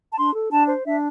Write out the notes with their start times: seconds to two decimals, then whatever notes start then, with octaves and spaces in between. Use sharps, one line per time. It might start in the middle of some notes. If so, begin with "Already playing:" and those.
0.13 A5
0.18 D4 C6
0.34 A4
0.51 D4 A5
0.69 C5
0.86 D4 E5